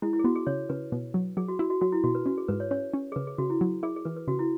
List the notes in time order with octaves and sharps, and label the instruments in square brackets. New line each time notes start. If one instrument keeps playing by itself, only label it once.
[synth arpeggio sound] G#3 [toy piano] E4
[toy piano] E4
G#4
[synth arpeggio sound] B3 [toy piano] F#4
[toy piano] G#4
[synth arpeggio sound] C#3 [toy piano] C#5
[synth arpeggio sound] C#3 [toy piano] B4
[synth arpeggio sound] B2
F#3
[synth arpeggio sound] F#3 [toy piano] G#4
[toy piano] F#4
[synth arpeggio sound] E4 [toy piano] F#4
[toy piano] F#4
[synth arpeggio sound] F#3 [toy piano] F#4
[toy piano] E4
[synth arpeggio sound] B2 [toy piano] F#4
[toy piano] B4
[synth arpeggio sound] C#4 [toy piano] F#4
[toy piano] G#4
[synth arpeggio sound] G#2 [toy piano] B4
[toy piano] C#5
[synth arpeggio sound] C#4 [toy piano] C#5
[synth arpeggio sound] C#4
[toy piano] G#4
[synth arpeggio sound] C#3 [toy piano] B4
[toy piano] G#4
[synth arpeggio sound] C#3 [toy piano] F#4
[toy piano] E4
[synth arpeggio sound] F#3
[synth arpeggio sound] E4 [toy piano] G#4
[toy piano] G#4
[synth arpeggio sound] E3 [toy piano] B4
[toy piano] B4
[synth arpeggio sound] C#3 [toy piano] F#4
[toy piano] E4